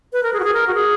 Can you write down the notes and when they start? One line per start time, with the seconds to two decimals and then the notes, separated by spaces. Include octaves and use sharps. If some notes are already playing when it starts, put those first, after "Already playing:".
0.13 B4
0.23 A#4
0.33 G#4
0.40 F#4
0.44 G#4
0.54 A#4
0.67 F#4
0.74 G#4